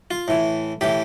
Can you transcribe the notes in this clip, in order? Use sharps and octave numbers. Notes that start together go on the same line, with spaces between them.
F4
A2 E3
A2 E3 G4